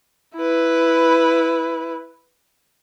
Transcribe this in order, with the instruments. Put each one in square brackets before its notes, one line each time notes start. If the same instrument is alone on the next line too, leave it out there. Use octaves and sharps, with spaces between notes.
[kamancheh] E4 B4